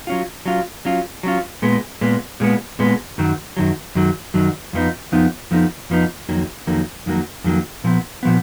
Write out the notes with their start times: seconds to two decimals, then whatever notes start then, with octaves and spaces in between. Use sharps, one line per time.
0.07 F#3 C#4 F4
0.46 F#3 C#4 F4
0.85 F#3 C#4 F4
1.23 F#3 C#4 F4
1.62 A#2 G#3 B3
2.01 A#2 G#3 B3
2.40 A#2 G#3 B3
2.79 A#2 G#3 B3
3.18 F#2 D#3 F#3
3.57 F#2 D#3 F#3
3.95 F#2 D#3 F#3
4.34 F#2 D#3 F#3
4.73 F2 F3 B3 D#4
5.12 F2 F3 B3 D#4
5.51 F2 F3 B3 D#4
5.90 F2 F3 B3 D#4
6.29 F2 D#3 F#3 A#3
6.67 F2 D#3 F#3 A#3
7.06 F2 D#3 F#3 A#3
7.44 F2 D#3 F#3 A#3
7.84 A#2 F3 B3
8.23 A#2 F3 B3